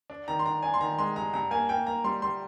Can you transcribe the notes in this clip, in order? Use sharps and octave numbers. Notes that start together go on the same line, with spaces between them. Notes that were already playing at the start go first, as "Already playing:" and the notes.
D4
D#3 A#5
C6
D4 A#5
D4 G#5
C6
D#3 A#5
G#3 C6
G2 A#5
G2 A#5
A#3 G#5
A#3 G5
A#3 A#5
G3 C6
G3 C6